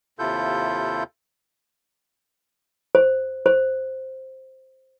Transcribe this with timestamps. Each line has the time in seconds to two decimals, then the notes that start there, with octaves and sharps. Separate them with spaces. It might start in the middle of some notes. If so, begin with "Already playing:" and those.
0.19 D#2 C3 E4 F4 A4 G6
2.95 C5
3.46 C5